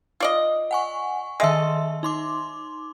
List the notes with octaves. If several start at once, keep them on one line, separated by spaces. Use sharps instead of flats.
F4 D5 D#5
F#5 G#5 C#6
D#3 G#3 A4 E5 C6
D#4 C6 D6